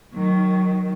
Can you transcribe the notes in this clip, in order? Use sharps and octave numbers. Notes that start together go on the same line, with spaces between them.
D#3 F#3